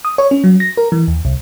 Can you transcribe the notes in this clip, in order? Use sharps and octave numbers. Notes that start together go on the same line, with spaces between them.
D#6
C#5
C#4
F#3
A#6
A#4
E3
D#2
C2